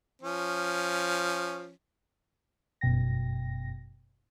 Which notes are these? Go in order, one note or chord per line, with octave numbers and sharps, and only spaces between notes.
F3 C#4
G1 F#2 B2 G5 A#6